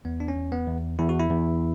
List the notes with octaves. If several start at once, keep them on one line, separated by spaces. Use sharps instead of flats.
E2 B3
D4
C#4
E2
B3
E2
E2 E4
F#4
E4
E2